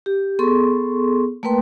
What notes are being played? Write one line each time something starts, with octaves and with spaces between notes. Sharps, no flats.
G4
B3 G#4 A4 C6 C#6
A3 A#3 A#4 B4 G5 C6